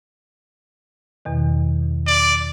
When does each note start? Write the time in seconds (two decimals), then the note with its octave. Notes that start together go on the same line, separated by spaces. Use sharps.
1.25 E2 B2 D#3
2.07 D5